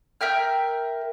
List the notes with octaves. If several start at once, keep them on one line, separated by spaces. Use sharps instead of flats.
A#4 E5 G5 F6